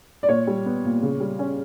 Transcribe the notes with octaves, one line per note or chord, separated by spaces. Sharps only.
D5
A#2 C#5
G3
B3
A#2
C#3
G3
C#4